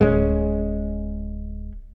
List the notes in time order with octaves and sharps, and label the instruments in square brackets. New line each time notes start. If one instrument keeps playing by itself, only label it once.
[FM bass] D1 [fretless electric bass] G#3 A#3 C#4